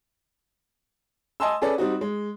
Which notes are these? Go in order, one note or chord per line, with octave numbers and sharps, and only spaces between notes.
D#5 G#5 A5 C6 E6
C#4 G#4 A4 B4 D5
G3 C4 D#4 F#4
G#3